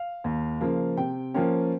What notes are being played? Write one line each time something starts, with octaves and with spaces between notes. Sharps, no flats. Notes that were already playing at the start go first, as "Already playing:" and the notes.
Already playing: F5
D#2
C#3 F3 A#3
C3 G5
F3 A#3 C#4 G5